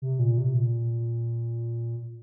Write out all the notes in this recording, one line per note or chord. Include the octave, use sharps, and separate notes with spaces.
C3
A#2
C3
A#2